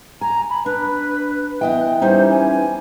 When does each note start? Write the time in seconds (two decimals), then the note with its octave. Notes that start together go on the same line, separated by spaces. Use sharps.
0.21 G#5 A#5
0.50 B5
0.66 D4 B4
1.61 E3 B3 D#5 G5
2.02 G3 C#4 D#4 C5
2.31 G#5